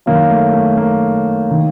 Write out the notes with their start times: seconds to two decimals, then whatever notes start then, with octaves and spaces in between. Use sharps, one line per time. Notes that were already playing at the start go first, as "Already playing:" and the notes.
0.06 F#2 D#3 A#3
0.30 A3
0.53 A3
0.77 A#3
1.51 D#3